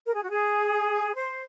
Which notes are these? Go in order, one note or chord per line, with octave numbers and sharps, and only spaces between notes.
A#4
G#4
F#4
G#4
C5